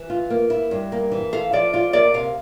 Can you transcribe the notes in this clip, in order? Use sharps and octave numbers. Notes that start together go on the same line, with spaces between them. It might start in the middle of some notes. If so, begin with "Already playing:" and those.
Already playing: E3
F4
A#3
E4
G2
A#3
E3
A4 F5
F3 D5
F4 D5
A#3 D5
C3 F5